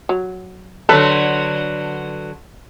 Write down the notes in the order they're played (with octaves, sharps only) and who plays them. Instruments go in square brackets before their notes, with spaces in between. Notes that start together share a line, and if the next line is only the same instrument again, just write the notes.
[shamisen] F#3
[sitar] D3 F#3 B4 [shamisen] A4